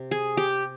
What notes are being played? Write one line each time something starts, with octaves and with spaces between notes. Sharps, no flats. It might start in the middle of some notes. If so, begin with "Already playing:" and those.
Already playing: C3
G#4
G4